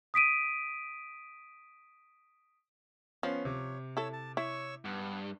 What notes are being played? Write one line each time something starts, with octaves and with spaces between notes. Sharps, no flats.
D#6 B6 D7 D#7
F3 B3 C#4 C7
C3 C#5
E4 A4 C#5 E6
A5
E4 C#5 C#6 E6
G2 B3